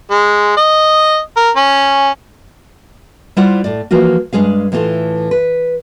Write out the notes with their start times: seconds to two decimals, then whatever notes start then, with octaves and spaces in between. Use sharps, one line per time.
0.11 G#3
0.57 D#5
1.37 A#4
1.56 C#4
3.37 G3 E4 F4 C5 D5 F#5
3.64 A2 D5
3.91 E3 F3 A#3 F4 F#4
4.33 G2 F#3 G#3 G#4 F5
4.72 A2 E3 F4 F#4 A4
5.31 B4